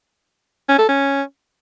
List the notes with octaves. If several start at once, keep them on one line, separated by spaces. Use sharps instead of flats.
C#4
A4
C#4